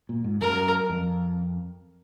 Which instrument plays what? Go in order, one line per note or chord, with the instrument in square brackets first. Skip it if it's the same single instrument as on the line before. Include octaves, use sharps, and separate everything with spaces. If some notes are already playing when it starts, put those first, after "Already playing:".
[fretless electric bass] A#2
G#2
[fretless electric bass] F#2 [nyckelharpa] A#4
[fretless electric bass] F2